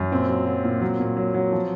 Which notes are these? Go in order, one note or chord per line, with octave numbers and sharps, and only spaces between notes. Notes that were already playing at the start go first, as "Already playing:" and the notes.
Already playing: F#2
A#2 C4
F#3
F#3
A#2
F#3
A#2
F#3
F#3
F3